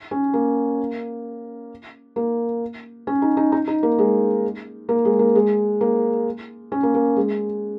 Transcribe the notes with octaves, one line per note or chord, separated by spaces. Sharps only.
C#4
A#3
A#3
C#4
D#4
D#4
D#4
D#4
A#3
G#3
A#3
G#3
A#3
G#3
A#3
C#4
A#3
A#3
G#3